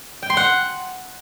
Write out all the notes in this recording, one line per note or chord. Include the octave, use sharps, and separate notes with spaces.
G5
C6
F#5